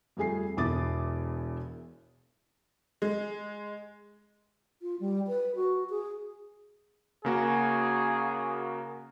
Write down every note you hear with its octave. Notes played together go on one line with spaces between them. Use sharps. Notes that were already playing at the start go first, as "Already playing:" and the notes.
F2 G3 A3 G#4 G#5 C7
E1 E2 E4 D6 D#6 A6
G#3
F4
G3
B4
F#4
G#4
C#3 A#3 F#4 G#4